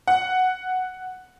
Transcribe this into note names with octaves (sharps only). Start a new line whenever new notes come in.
F#5